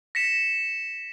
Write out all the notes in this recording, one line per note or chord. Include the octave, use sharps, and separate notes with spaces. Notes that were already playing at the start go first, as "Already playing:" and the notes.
A#6 B6 C#7 E7